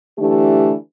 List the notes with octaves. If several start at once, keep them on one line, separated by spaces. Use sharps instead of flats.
D3 E3 A3 D4 G4